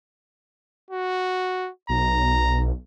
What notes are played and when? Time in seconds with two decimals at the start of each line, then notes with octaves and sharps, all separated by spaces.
0.91 F#4
1.89 B1 A#5